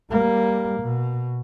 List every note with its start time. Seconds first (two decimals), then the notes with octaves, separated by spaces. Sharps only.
0.10 G3 A#3
0.81 B2